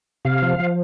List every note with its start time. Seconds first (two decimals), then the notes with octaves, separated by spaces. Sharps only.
0.25 C3 F5
0.42 F3
0.59 F3